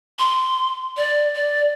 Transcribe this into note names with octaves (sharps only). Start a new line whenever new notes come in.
C6
D5
D5